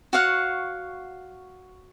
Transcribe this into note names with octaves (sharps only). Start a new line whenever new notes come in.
F#4 C#5 F5 F#5